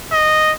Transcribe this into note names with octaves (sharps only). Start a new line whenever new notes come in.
D#5